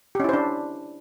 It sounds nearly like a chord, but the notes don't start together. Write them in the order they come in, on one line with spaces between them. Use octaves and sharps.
G4 C#4 E4 C5 D4